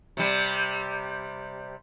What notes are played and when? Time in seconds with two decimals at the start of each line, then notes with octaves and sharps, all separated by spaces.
0.17 C3 G3